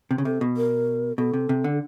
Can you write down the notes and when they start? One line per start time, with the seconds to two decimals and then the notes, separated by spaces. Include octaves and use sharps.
0.11 C3
0.18 C#3
0.25 C3 A4
0.41 B2
0.57 A#4
1.18 B2 A4
1.33 C3
1.49 C3
1.64 D3